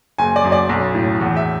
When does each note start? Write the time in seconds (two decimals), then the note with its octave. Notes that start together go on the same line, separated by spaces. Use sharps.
0.18 F#1 G#5
0.36 D5
0.44 F#2
0.52 D5
0.69 B1
0.95 A2
1.20 E2
1.37 E5